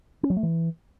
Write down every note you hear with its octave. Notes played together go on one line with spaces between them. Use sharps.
C#4
F#3
A3
E3